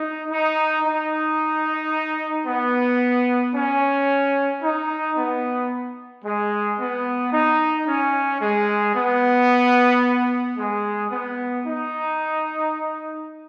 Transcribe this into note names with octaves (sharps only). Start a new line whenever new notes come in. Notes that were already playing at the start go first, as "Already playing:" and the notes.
Already playing: D#4
D#4
D#4
B3
C#4
D#4
B3
G#3
B3
D#4
C#4
G#3
B3
G#3
B3
D#4